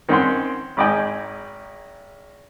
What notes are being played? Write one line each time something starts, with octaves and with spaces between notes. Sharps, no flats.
D#3 C4 C#4 F#5 C6
G#1 G#2 D5 D#5 G5 G#5